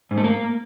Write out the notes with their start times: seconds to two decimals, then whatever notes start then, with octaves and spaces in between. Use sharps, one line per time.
0.11 G#2
0.18 A3
0.24 A#3